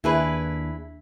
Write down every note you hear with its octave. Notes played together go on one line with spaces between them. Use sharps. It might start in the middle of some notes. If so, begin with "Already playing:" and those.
D#2 D4 E4 G#4 B4